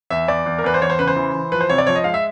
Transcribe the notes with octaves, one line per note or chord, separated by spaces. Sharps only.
E2 E5
E2 D5
E2
A#4
E2 B4
C5
E2 C#5
C5
C#3 B4
C5
E3
E3
F3 B4
C5
C3 C#5
D5
F3 C#5
D#5
G#3 F5
E5